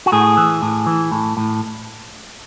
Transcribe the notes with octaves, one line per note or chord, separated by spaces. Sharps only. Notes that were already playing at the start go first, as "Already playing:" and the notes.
F#4
A2 G#4
E3
A2
E3
A2
A2